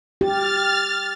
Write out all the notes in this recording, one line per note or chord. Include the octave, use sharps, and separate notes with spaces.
G4 F6 A6